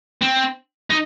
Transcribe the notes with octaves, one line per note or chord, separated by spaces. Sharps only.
C4
D#4